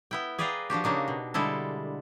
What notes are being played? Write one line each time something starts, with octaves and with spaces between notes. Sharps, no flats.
B3 E4 G5
G#4 B4 D5 F5 G5 A#5
F3 D4 F#4 G4
C#3 A#3 D4 D#4
B2
D3 G3 G#3 E4 A4